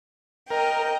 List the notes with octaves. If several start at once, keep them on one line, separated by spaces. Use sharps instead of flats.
A#4 D#5 G5